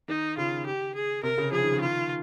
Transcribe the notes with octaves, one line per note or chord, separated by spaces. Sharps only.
D#3 D#4
C#3 F4
G4
G#4
C3 A#4
C#3
F3 G#4
D#3
C#3
D#3 F4